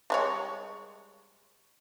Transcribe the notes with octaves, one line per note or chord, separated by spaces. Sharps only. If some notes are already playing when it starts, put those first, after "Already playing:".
G3 G#3 C#5